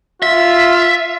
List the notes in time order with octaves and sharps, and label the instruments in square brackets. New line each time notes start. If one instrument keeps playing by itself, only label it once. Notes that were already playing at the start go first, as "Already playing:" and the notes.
[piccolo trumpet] F4 [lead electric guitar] E5